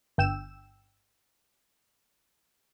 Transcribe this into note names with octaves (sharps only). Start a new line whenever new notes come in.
G1 G5 E6 E7